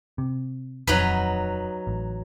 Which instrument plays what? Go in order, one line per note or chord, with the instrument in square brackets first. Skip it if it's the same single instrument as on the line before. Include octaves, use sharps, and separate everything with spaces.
[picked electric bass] C3
[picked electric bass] D#1 F2 [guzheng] F#3 D#4 B4
[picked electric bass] A1